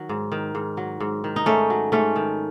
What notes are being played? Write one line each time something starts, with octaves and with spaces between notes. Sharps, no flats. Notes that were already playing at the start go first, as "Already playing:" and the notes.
Already playing: D#3 F#3
G#2
D#3
G#2
F#3
G#2
D#3
D#4
G#2 A3 C#4
F#3
G#2 A3 C#4
D#3